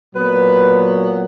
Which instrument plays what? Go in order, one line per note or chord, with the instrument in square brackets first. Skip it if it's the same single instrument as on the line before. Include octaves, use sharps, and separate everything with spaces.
[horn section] A#2 F#3 B3 B4